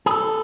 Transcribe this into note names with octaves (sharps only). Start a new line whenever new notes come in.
G#4
A4